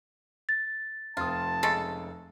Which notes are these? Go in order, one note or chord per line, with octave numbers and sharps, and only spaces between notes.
A6
F1 C4 F4 A5 D#6
C#3 G#3 A4